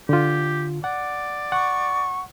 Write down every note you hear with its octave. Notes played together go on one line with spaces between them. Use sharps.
D3 F4 G4
D5 F#5
F#5 C#6